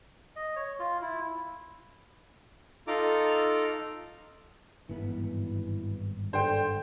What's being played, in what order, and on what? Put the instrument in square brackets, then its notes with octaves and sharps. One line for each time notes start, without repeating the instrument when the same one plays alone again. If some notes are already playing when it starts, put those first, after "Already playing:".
[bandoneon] D#5
C#5
F4
E4
[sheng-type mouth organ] D#4 F4 A4 A#5 D6
[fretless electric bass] G#1 G2 B3 [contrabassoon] E3
[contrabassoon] D3 [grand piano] C5 G5